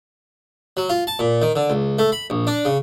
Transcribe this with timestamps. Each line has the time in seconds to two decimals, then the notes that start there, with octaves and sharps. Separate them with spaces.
0.77 F#3
0.90 F4
1.07 A5
1.19 A#2
1.42 D#3
1.56 D3
1.70 C#2
1.99 A3
2.12 B5
2.30 A#1
2.47 D4
2.65 C#3